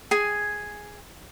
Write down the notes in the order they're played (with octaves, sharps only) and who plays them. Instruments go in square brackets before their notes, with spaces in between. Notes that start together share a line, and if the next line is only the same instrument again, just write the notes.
[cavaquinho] G#4 G#5